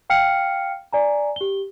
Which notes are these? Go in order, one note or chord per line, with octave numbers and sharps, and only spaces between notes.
F5 G5 F6 C7 C#7
D5 G#5 A#5
G4 G7